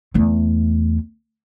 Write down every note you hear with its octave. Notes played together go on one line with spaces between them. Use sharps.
E2 A3